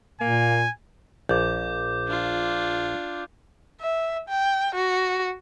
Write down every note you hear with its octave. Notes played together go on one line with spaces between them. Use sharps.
A#2 A#3 G#5
A#1 D6 G6
D4 F4
E5
G5
F#4